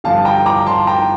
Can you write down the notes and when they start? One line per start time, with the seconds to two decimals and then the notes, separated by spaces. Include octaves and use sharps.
0.04 G1 G2 F3 F5 A5
0.25 G5 A#5
0.46 A#5 D6
0.66 A5 C6
0.87 G5 A#5